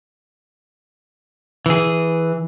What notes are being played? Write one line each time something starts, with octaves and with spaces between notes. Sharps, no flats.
E3 G#4